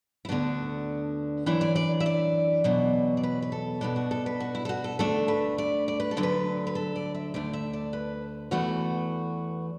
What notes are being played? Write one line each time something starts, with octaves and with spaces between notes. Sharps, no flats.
E4
D2 D3 B3 D4 F#4
F#2 E3 D4 E4
D5
D5
E5
D5
E2 B2 F#3
D5
B4
B4
A4
B2 B3 D4 A4
F#4
A4
B4
F#4
E4
A4
F#4
A4
D2 D3 A3 D4 A4
B4
D5
D5
B4
A4
D2 D3 F#3
B4
B4
A4
D5
E5
D2 D3 A3 D5
E5
D5
B4
E2 E3 A3 F#4